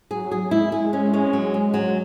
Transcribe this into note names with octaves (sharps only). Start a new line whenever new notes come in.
F#3 G#4
G#4
G#3 E4
G#4
C#4
C#4
F#3
C#4
F#3